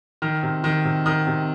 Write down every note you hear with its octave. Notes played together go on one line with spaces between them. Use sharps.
D#3 F6
C3
D#3
C3
D#3 D#6
C3